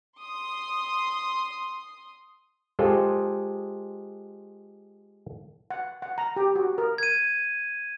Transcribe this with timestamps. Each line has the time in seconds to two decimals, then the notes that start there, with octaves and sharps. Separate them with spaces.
0.19 C6 D#6
2.79 G#3 F4 G4 A4 C5 D#5
5.70 F#5
6.02 F#5
6.18 A#5
6.36 G4
6.56 F#4
6.78 A#4
6.98 G#6 D#7